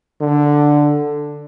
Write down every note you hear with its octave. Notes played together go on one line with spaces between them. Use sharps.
D3